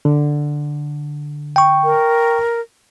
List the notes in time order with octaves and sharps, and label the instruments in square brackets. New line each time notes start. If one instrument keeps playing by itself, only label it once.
[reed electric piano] D3
[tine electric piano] G5 C#6
[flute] A#4